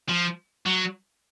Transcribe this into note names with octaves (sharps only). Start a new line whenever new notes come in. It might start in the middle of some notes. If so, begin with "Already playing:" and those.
F3
F#3